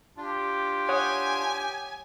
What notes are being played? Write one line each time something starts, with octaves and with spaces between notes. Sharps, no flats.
D4 F4 G4
C#5 F#5 G#5 D#6